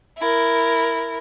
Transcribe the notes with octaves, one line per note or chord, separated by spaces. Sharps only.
E4 A#4